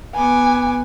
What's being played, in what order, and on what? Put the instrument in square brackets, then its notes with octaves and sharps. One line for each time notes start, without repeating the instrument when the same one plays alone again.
[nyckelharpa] B3 D6 [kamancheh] G#5